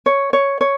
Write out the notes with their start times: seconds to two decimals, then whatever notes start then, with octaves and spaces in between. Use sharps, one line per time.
0.06 C#5
0.33 C#5
0.61 C#5